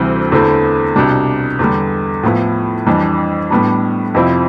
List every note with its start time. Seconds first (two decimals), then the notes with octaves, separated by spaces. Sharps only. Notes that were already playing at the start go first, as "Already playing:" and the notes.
Already playing: D2 C3 E3 G3 C4
0.32 E2 D3 A3 C4 E4
0.96 C2 B2 G3 D4
1.59 E2 D3 G3
2.23 A2 F3 B3 E4
2.87 F2 E3 G3 D4
3.51 A2 G3 B3 D4
4.14 F2 C3 F3 C4 E4